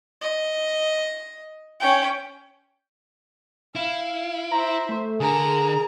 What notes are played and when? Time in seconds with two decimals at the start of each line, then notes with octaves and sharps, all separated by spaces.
0.21 D#5
1.80 C#4 G5
3.75 E4 F5
4.52 C5 E5 A#5
4.89 A3
5.20 D3 G#4 A#4 A#5